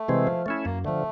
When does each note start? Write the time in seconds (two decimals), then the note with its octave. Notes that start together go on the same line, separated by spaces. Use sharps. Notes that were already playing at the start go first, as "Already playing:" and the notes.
Already playing: A3
0.08 C3 E3 G#3 C4
0.27 F3
0.46 A3 C#4 E4
0.65 F#2 A#3
0.85 D3 F3 A3